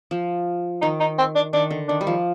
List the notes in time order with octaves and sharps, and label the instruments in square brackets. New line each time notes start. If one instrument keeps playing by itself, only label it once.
[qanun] F3
[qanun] D#3 [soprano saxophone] D#4
[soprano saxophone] D#4
C4
D4
[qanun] D#3 [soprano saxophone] D4
[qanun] D3
[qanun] D#3 [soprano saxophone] D4
[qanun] G3
F3